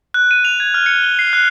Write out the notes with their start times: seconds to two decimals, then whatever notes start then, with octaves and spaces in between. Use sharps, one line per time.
0.14 F#6
0.31 D#7
0.45 F7
0.60 G#6
0.74 F6
0.86 C#7
1.03 G7
1.19 C7
1.33 F#6